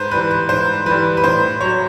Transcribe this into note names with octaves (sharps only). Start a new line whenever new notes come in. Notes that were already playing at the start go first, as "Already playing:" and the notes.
Already playing: G#2 B4 C5
E3 G3 B4
B4
G#2 C5
E3 G3 B4
B4
A2 C5
F#3 C#5